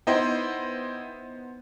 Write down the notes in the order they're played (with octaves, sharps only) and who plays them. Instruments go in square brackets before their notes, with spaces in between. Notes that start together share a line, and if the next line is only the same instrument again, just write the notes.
[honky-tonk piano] B3 D#4 C5 [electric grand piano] E4 D#5 G5